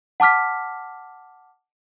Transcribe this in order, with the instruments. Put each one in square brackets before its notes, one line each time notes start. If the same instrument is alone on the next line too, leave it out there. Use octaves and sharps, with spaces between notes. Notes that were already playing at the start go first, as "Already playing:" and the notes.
[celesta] F#5 A5 D6 F6 B6